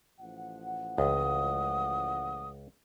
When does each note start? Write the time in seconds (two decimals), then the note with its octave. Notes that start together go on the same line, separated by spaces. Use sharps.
0.19 A1 F3 F#5
0.98 C#2 D#6